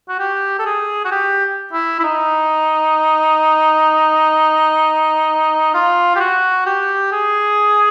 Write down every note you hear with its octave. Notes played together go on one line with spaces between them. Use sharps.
F#4
G4
A4
G#4
F#4
G4
E4
E4
D#4
F4
G4
F#4
G4
G#4